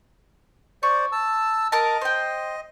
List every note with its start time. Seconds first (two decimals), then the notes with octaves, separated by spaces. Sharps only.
0.83 C5 D5 C#6
1.12 A5 E6
1.72 A#4 D#5 A5
2.01 C5 G5